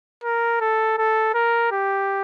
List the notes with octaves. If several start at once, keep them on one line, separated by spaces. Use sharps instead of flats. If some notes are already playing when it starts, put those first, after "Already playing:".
A#4
A4
A4
A#4
G4